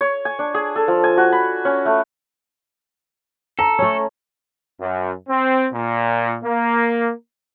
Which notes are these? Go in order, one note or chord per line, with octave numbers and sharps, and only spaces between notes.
C#5
G#5
D4
G#4
A4
F3
G#5
F#4
B5
C#4
A3
A4 A#5
A3 C#4
F#2
C4
A#2
A#3